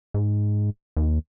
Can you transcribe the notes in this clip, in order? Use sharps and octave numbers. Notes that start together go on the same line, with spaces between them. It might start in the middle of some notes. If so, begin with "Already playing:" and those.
G#2
D#2